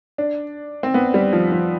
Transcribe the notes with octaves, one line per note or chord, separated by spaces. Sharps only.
D4
C4
B3
G3
F3
F3